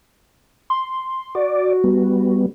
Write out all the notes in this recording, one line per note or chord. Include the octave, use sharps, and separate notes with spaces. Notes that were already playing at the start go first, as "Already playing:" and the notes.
C6
F#4 D5
G3 B3